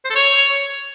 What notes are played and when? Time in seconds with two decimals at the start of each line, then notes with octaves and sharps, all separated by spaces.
0.05 C5
0.10 A4
0.16 C#5